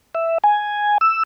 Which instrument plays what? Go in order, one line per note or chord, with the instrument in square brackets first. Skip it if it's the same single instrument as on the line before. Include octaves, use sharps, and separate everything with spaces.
[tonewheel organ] E5
G#5
E6